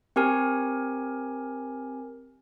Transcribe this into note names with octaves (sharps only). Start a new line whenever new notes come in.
C4 G4 A#4 G#5